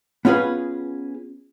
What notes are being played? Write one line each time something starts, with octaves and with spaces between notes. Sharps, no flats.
B3 C#4 F4 G#4 B4